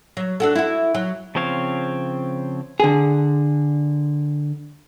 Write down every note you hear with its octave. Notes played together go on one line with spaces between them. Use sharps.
F#3
D4 F#4 A4
E4 F#4
F#3
C#3 F3 C4 C#5 F5
D3 G#4